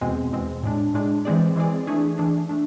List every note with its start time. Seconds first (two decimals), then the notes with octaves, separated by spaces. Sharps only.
0.01 E2 B2 G#3 C4
0.32 E2 B2 G#3 C4
0.63 A2 G#3 D4
0.94 A2 G#3 D4
1.25 E3 G#3 C4 G#4 D5
1.56 E3 G#3 C4 G#4 D5
1.87 E3 A3 D4 G#4
2.18 E3 A3 D4 G#4
2.49 A3 D4